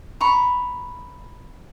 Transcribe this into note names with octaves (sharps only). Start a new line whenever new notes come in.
A#5 B5 C#6